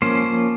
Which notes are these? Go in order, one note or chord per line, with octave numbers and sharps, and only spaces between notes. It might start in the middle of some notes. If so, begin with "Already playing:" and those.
F3 A#3 C#4 C5